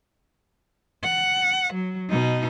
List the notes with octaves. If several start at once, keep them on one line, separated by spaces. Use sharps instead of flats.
F#5
F#3
B2 D#4